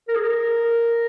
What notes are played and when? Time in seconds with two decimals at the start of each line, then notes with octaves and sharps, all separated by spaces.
0.08 A#4
0.15 G#4
0.23 A#4